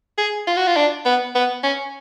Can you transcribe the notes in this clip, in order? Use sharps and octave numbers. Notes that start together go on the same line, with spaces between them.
G#4
F4
F#4
F4
D4
B3
B3
C#4